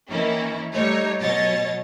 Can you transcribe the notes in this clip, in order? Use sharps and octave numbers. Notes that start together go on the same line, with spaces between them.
D#3 E3 A#3 C#4 E4
G3 A3 D#4 C#5
B2 F#3 C#5 D#5 A6